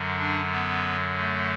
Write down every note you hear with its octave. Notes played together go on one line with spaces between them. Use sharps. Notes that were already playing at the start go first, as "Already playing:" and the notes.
Already playing: F#2 D3 F#3
D4
B3
A3